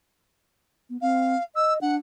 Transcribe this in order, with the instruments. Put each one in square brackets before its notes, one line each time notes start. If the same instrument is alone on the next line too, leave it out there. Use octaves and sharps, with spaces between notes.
[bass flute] B3
[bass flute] C4 [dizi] F5
[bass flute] D#5 [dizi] E6
[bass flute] D4 [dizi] F#5